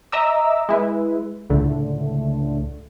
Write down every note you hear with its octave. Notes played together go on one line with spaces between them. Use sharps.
D#5 E5 A#5 D6 E6
G#3 E4 B4
C#2 A2 D3 A3